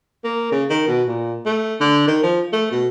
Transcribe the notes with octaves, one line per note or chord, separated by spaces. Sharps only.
A#3
C#3
D#3
B2
A#2
A3
D3
D#3
F3
A3
B2